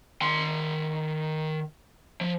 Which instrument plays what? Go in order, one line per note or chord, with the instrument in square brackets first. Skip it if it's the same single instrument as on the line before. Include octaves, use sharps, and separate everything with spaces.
[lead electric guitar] D#3 C6
F3